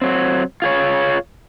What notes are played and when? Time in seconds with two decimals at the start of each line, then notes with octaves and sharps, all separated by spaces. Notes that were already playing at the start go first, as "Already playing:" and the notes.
0.02 F#3 C4
0.62 F4 G#4 C#5